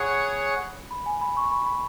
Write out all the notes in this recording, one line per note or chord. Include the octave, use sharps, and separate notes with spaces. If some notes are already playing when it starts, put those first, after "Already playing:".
Already playing: G#4 C#5 F#5 B5
B5
G#5
B5
C#6
B5
B5